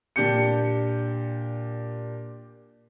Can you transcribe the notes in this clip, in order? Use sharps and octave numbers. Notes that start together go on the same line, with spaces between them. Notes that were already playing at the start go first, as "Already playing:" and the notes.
A#2 D4 G4 G6 C#7